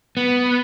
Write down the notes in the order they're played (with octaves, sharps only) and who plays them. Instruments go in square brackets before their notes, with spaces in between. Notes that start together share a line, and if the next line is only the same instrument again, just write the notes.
[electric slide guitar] B3